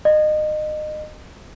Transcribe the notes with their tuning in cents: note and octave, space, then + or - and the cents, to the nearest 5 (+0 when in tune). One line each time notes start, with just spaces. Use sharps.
D#5 -30